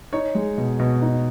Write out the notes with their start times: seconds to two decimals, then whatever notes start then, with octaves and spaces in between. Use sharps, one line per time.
0.13 D#4 C#5
0.35 G#3
0.58 B2
0.80 B2
1.02 D#4